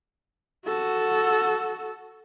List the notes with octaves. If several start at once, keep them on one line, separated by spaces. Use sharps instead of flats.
F#4 A4